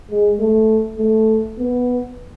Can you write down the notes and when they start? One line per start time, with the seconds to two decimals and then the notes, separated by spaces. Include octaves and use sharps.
0.10 G#3
0.40 A3
0.99 A3
1.59 B3